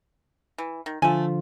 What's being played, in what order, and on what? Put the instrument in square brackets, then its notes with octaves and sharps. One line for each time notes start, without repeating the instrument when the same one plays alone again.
[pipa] E3
D#3
[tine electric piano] D3 F3 F4 [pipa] A3 G#5